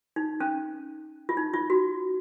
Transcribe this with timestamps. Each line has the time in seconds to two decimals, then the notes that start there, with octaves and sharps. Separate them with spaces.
0.16 D#4
0.40 C#4
1.29 F4
1.37 D#4
1.54 F4
1.70 F#4